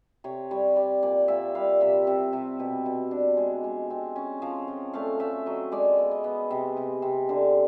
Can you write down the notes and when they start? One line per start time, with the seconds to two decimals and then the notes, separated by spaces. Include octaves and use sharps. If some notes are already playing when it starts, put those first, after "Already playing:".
0.24 C3 C#5
0.51 G3 C#5
0.76 G3 D5
1.03 A#2 D5
1.28 A#2 E5
1.55 G3 F5
1.80 C3 E5
2.07 C3
2.33 C3
2.59 B2
2.86 B2
3.11 D4
3.37 G#3
3.64 G#3
3.90 C4
4.16 C#4
4.42 F3
4.68 F3
4.93 A3 F5
5.20 A3 E5
5.46 F#3 D#5
5.72 G#3 D5
5.99 B3
6.11 D#5
6.24 B3
6.51 C3
6.76 C3
7.02 C3
7.29 D3